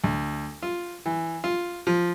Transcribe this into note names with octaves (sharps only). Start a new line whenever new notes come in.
D2
F4
E3
F4
F3